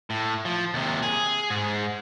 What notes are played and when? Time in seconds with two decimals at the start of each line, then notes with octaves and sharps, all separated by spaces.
0.10 A2
0.45 F3
0.74 D#2 C3
1.03 G#4
1.50 G#2